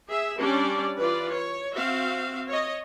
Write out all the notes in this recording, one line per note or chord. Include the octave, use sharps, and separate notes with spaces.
G#4 E5
G3 C#4 D4 D5
E3 F4 B4 D5
C#5
C4 F#4 E5 F5
C#5 D#5